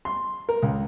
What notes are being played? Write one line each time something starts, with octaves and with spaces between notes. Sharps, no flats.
C6
A#4
C#2